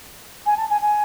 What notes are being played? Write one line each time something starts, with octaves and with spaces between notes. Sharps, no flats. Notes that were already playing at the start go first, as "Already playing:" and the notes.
G#5
A5
G#5
G#5